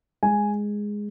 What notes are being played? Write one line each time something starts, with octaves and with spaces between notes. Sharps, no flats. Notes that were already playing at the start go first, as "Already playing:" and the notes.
G#3 G#5